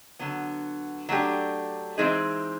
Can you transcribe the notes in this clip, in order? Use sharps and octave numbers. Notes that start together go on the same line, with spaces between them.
D3 F#3 B3
F#3 A3 D4 G4
E3 G#3 C4 D#4 G#4